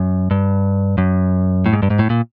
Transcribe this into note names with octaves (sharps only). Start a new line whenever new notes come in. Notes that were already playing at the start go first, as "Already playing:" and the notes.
Already playing: F#2
G2
F#2
A2
G#2
G2
G#2
A2
A#2